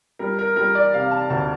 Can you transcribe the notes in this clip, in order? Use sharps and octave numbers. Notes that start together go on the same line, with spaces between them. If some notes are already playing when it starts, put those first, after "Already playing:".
G3 A#4
A#4
G3 A#4
D5
C3 F5
A5
D2 A5